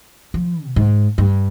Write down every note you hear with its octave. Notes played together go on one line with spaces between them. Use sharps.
F3
B2
G#2
G2